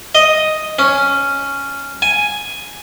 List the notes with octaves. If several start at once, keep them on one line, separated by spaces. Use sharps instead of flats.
D#5
C#4
G#5